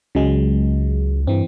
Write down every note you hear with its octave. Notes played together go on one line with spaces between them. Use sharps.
C#2 C#3 F#3 G#3
G2 E3 C4